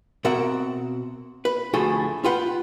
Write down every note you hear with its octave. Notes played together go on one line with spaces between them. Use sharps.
B2 C4 A#4 E5 F#5
B4
D2 A2 F3 F#4 G#4 A4
F4 G4 B4 F#5